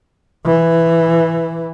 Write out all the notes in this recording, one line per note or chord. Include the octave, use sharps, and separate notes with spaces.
E3